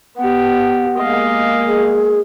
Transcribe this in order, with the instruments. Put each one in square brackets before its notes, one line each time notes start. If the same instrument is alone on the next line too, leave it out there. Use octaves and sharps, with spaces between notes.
[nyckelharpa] B3 G4 [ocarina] F#5
[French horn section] G#3 A#3 [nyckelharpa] D#5 F5
[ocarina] G#4